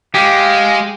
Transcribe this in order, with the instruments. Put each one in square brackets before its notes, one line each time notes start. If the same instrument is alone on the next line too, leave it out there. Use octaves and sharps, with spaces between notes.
[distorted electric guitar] G#3 [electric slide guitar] G4 [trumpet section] F5